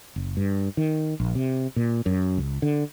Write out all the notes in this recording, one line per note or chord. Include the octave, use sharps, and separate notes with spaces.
F#1
G2
D#3
A#1
C3
A#2
F#2
C#2
D3